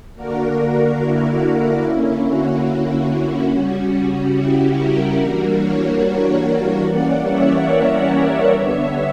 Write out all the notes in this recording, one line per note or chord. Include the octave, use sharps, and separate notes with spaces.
D3 A#3 D4 F#4 A#4
F#4
E4
F#4
D3 A#3 C#4 E4
F#4
E4
C#3 G3 C#4 F#4
E4 G4
F#4 A#4
E3 G3 A#3 D4 F#4 A#4
A#4 C#5
A#4 C#5
E3 G3 A#3 C#4 D5 F#5
C#5 E5
A#4 C#5
D5 F#5
D3 G3 B3 D4 C#5 E5